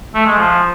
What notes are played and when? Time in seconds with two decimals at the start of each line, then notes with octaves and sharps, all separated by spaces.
0.15 A3
0.26 G#3
0.37 F3